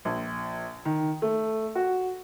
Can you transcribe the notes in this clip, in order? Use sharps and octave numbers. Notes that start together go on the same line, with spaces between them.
A#1
D#3
A3
F#4